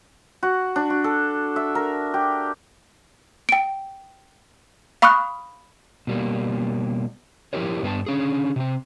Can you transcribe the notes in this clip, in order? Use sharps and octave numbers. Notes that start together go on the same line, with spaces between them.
F#4
D4
F#4
A4
E5
A#4
G4
G5 D7
F5 B5 C#6 D#6 F6 F#6
B2 G3 A#3
F3 A3 E4 G4 A#4 C#5
G2 B3 G#4 A5
D3 C#4 G#4
C3 C4